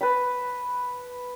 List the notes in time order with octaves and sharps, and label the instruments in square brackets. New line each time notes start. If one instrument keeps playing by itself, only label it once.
[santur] B4 A5 B5